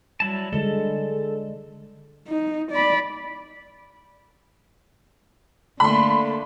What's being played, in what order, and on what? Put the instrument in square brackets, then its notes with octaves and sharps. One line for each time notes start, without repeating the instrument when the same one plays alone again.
[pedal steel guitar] F#3 E4 A5 [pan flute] G3
[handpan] D3 G#3 [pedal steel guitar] A4
[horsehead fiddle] D#4
D5 B5
[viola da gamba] D3 A3 A#3 [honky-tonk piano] B5 C6